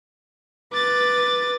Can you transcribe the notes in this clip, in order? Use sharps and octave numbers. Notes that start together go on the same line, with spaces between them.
B4 D6 A6